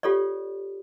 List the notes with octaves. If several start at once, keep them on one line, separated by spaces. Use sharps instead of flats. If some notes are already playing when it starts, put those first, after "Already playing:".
F4 G4 A4 C#5 D5